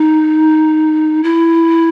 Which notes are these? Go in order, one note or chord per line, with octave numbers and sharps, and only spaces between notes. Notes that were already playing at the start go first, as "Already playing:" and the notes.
Already playing: D#4
E4